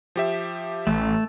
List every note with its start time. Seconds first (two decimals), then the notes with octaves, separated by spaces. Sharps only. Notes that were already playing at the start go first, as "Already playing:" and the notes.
0.16 F3 G4 E5
0.87 A1 A3